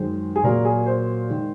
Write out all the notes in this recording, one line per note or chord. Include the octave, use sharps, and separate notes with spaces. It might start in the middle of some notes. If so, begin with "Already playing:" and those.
Already playing: F#2 D#3 G#3 C5
G#4
A#2 F#3 A#3 A#4
G#4
C5
D#3 G#3